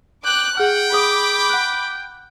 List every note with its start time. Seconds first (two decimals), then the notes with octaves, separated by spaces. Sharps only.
0.25 G5 D6 F#6
0.57 G#4 F#5 G5 F6
0.92 G#4 B5 D6 D#6
1.50 F#5 F#6